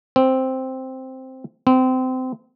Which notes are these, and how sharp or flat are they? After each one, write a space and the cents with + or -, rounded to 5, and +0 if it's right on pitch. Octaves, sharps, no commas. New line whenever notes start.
C4 +0
C4 -25